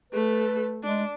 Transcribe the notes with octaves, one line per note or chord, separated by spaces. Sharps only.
A3 A4 B4
G#3 D4